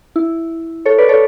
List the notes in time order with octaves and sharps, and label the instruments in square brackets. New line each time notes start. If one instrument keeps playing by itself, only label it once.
[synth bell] E4
A4 C#5
B4 D5
A4 C#5